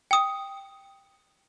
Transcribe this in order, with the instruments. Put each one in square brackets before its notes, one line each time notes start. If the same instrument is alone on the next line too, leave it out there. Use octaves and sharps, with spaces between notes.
[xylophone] G5 D#6